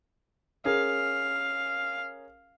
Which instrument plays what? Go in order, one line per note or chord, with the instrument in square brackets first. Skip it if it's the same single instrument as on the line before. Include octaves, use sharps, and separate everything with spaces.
[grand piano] C#4 G#4 A#4 [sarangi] F5